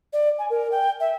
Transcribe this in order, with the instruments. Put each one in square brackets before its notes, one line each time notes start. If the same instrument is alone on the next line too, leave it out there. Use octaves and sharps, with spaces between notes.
[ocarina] D5
G#5
A#4
G5
E5